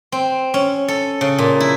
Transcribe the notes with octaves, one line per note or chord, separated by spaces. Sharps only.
C4
C#4
A4
C#3
A#2
E4